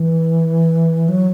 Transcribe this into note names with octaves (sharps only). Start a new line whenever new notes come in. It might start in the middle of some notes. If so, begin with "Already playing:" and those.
Already playing: E3
F#3